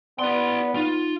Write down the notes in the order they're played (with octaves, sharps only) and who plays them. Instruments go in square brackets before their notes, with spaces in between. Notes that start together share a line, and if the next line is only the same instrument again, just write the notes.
[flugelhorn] B3 [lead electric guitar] E4 C6 [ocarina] D5
[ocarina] D#4 [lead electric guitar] F4